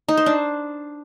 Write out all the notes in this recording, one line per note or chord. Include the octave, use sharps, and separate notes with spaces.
D#4
C5
D4